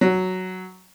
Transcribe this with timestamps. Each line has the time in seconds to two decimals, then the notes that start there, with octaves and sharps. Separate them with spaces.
0.01 F#3